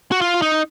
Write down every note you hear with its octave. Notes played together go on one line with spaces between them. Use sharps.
F#4
F4
D#4